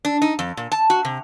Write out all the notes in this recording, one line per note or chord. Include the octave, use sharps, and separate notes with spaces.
D4
D#4
F2
A#2
A5
F#4
C3